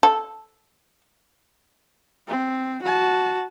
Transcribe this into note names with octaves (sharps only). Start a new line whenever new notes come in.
A4
C4
F#4 A5